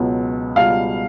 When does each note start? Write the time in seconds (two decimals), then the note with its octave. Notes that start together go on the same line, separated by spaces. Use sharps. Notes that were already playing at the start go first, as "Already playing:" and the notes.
Already playing: C#2 B2 F#3 B3
0.56 C#2 B2 G3 F5